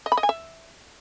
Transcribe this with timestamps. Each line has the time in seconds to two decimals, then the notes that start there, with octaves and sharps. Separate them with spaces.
0.06 D#5
0.12 B5
0.17 D#5
0.23 G#5
0.29 E5